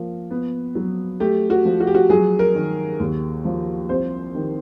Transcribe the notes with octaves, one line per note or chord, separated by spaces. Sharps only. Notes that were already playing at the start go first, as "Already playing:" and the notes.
Already playing: F3 A#3
B3
F#3
A3 G4
F#4
F3
F#4
G4
F#4
F#3 G#4
A#4
D#3
D#2
F3
C2 C5
D#3